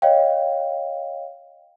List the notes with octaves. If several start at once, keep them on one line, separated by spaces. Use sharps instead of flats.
C#5 D#5 F5 G5